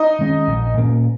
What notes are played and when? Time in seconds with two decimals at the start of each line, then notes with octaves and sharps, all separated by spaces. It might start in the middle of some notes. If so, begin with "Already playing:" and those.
Already playing: D#4 D#5
0.19 D#3 G#3 C#4
0.47 A#1
0.78 A#2 A#3 C#4